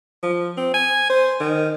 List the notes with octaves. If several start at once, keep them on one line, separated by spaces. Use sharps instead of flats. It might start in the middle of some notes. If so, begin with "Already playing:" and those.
F3
C4
G#5
C5
D#3